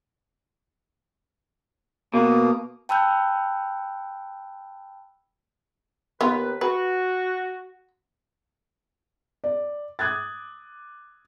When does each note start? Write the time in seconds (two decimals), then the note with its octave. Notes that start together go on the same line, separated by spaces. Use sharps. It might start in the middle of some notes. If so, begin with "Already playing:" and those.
2.14 B2 A#3
2.89 G5 A5 B5 E6 F#6 G6
6.21 D#2 B3 F4 B4
6.61 F#4 B4
9.44 D5
9.99 D6 D#6 F#6 G#6 A6